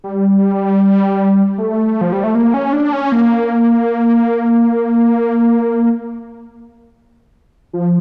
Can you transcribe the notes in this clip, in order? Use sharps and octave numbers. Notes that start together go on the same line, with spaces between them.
G3
A3
F3
G3
A3
A#3
C#4
D4
C#4
A#3
F3